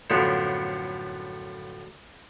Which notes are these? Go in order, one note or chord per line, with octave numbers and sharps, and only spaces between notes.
F#2 A2 D3 F3 B3